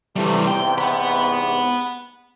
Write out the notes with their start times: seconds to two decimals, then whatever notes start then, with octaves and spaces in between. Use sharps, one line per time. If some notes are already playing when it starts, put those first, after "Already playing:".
0.16 C3 E3 G3 A3
0.47 E2 G#2 C3 G5
0.78 F#5 B5